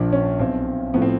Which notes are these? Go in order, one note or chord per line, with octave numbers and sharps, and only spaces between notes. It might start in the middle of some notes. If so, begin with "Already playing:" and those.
Already playing: A#1 A#2 F3 D4
C#4
B1 B2 C4
A2 F3 B3
C4